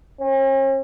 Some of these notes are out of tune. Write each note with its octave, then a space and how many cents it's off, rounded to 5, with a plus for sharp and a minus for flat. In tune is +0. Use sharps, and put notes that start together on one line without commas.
C#4 -45